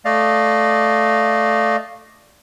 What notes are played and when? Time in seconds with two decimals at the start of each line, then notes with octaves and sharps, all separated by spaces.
0.05 A3 D5 D#5 F5